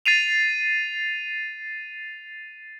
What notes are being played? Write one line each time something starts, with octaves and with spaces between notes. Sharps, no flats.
A6 C7 D#7 F7